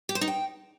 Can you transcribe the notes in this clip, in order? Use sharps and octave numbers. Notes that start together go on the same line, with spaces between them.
G4
C5
D#4
G5